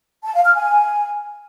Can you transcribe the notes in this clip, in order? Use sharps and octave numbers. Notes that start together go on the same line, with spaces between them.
A5
F5
F6
G#5